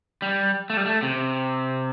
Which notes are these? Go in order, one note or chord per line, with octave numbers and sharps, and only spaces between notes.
G3
A3
G3
A3
C3